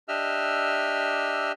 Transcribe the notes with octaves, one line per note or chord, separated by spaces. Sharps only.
D4 G4 D#5 E5 E6 F6